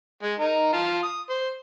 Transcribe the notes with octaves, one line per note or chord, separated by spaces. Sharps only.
G#3
D#4 A#4
F4 A5
D#6
C5